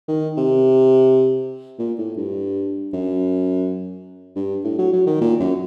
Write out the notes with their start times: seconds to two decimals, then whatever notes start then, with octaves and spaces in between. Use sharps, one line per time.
0.08 D#3
0.37 C3
1.79 A#2
1.98 A2
2.17 G2
2.93 F#2
4.36 G2
4.64 A2
4.78 F#3
4.93 F#3
5.06 D#3
5.21 A#2
5.40 F#2